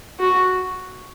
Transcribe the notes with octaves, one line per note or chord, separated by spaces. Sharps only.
F#4